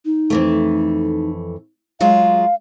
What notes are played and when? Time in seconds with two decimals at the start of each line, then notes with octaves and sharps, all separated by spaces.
0.05 D#4
0.30 F2 E3 A3
2.01 F#3 G#3 F4 F5